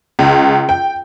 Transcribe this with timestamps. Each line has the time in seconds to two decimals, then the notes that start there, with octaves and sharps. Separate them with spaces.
0.19 C#2
0.69 G5